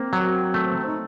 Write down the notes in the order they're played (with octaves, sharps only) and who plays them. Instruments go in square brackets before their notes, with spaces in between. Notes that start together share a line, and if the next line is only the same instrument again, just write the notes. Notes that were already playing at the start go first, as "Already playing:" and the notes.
Already playing: [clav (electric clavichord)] A#3 [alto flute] C4
[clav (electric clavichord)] F#3
A3
[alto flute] D#4